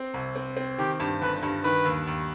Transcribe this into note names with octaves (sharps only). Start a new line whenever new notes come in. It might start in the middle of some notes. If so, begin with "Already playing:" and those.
Already playing: C4
C2
C4
C4
D#3 G4
G2
G1 B4
G2
D#3 B4
D#2
D#2